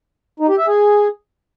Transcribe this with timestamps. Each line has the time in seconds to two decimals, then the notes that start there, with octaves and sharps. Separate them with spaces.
0.40 D#4
0.49 G4
0.58 E5
0.67 G#4